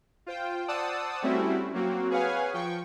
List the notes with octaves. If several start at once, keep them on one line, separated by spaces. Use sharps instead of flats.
F4 C5 G5
C5 D5 F#5 A5 D#6 E6
G3 A3 C4 C#4 E4 F#4
F#3 A#3 C4 F#4
G#4 B4 C#5 F5 F#5 G#5
F3 G5 C#6